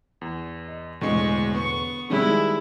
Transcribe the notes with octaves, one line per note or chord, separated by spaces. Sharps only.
E2
D#5
E1 A1 D2 D3 G#3 C#6
B3 C#6
D#3 G3 G#3 E4